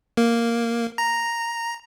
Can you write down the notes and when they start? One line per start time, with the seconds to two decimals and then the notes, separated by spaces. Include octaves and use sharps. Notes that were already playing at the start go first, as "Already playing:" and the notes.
0.17 A#3
0.98 A#5